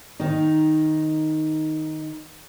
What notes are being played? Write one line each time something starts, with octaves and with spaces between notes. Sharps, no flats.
D#3 D#4